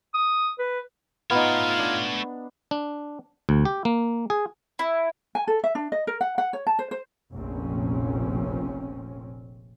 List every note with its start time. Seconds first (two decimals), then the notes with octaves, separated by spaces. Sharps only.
0.14 D#6
0.59 B4
1.30 A3 B3 D#4 F4 C#5
1.79 D4
2.71 D4
3.49 D2
3.65 G4
3.85 A#3
4.30 G#4
4.79 E4
5.35 G#5
5.48 A4
5.64 E5
5.75 D4
5.92 D#5
6.07 A#4
6.21 F#5
6.38 F#5
6.53 C#5
6.67 A5
6.79 C5
6.91 C5
7.34 F1 A#1 A#2 C4 C#4